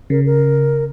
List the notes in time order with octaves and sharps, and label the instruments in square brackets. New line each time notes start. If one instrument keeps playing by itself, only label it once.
[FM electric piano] C#3 [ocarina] A#4
[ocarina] A#4